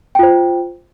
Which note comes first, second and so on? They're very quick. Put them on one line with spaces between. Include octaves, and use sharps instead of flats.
G5 F4 C5